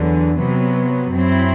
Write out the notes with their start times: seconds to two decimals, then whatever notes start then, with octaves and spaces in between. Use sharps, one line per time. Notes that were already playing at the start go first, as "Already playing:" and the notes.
Already playing: E2 D3 F#3
0.38 C3 F#3 B3
1.11 F#2 F#3 C4 E4